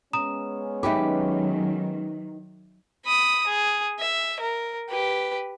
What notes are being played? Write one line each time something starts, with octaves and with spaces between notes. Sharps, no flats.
G#3 B3 C#4 A#5 D#6 E7
D#3 F#3 D#4 G4 B4 E5 D6
B5 D#6
G#4
E5
A#4
G4 B4